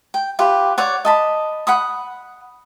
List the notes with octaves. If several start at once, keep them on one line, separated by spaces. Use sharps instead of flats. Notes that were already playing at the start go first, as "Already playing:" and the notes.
G5
F4 G4 B4
C#5 D5 F#5
D#5 A5 B5
F#5 B5 D#6